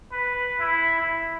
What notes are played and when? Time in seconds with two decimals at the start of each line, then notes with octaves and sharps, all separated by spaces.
0.12 B4
0.60 E4
1.00 E4